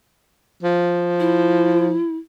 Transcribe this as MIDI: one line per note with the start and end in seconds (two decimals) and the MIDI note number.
0.63 1.97 53
1.20 2.17 64